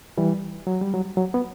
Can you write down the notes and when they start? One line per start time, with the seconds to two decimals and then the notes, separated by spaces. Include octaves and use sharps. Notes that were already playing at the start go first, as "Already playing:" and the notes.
0.18 E3 G3
0.67 F#3
0.81 G3
0.94 F#3
1.17 F#3
1.34 B3